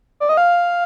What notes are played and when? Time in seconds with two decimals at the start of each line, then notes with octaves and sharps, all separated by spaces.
0.20 D5
0.29 D#5
0.37 F5